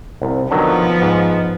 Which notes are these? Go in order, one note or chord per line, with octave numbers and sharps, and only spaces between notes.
C2
D3 D#3 F3 F#3 B3
G#2